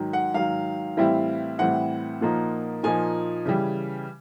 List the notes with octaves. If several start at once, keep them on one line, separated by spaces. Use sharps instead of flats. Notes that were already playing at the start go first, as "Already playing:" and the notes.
Already playing: G#2 D#3 F#3
F#5
G#2 D#3 F#3 F5
A2 E3 G3 C4 E4
A2 E3 G3 C4 E4 F#5
A#2 F3 A#3 D#4
A#2 F3 A#3 D#4 G#5
C#3 E3 G3